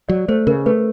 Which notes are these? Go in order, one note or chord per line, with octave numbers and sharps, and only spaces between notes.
F#3 D5
A3 C5
C#3 A#4
A3 B4